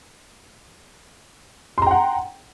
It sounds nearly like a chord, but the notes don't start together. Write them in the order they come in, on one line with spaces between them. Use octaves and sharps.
C6 A#5 G5 F#5